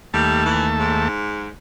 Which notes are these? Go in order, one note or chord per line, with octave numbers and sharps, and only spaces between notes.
D#2 G3 A3 A5
E3
G#2